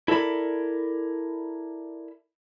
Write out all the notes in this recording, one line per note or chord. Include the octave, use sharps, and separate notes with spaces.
E4 A4 A#4 D5 B5